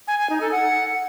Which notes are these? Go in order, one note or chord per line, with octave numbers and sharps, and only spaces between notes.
G#5
G#5
D#4
A4
F#5